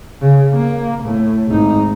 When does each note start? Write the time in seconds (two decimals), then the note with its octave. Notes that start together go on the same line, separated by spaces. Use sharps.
0.21 C#3
0.54 A#3
1.04 A2
1.48 G#1 D#4